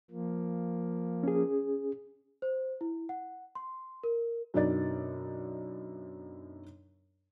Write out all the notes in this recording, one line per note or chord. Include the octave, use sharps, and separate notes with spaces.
F3 A#3
C#4 G#4
C5
E4
F#5
C6
A#4
F#2 B2 D4 D#4 D5 A6